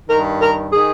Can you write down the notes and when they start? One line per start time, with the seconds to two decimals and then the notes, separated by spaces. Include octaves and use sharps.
0.10 G2 D#3 A#4
0.42 A#4
0.73 D#3 G#4